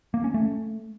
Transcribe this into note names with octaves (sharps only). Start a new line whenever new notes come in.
A#3
C#4
A3